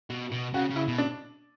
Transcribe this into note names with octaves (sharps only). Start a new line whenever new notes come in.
B2
B2
C#3 F#4
C#3
E4
B2
D4